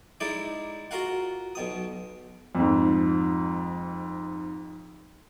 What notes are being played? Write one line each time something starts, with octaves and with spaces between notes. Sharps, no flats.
G#3 D#4 E4 D5
F4 F#4 A#4 F5 F#5
B1 B2 D#6
F2 G#2